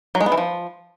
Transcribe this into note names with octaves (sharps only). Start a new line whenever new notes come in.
F#3
G#3
B3
E3
F3